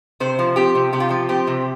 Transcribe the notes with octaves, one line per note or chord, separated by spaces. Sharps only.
C3 C5
F3
C4 G4
C3
C3 G4
F4
F3 G4
C4 G4
C3